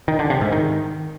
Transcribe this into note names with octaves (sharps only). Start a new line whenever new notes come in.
D#3
D3
C3
G#2
D#3